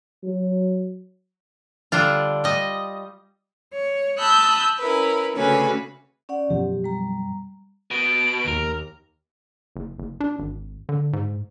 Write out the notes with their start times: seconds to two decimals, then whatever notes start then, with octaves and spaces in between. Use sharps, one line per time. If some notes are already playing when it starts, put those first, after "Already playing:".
0.24 F#3
1.92 D3 G3 D4 F4
2.44 G3 D#5
3.74 C#5
4.19 A5 B5 D#6 E6 F#6 G6
4.79 C#4 E4 A#4 B4
5.36 D2 C#3 C#4 F#4 B4 G#5
6.29 C#4 D5 F#5
6.50 F#2 B2 F3 G4
6.84 G3 A#5
7.91 B2 D7
8.47 D#2 A#4
9.76 F#1
9.98 F#1
10.20 D4
10.39 G#1
10.89 D3
11.13 G#2